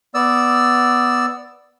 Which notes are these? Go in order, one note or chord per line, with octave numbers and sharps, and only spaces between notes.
B3 D5 E6